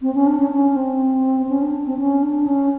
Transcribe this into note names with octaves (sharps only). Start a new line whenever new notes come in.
C4
C#4
D4
C#4
C#4
C4
C#4
D4
C4
C#4
D4
C#4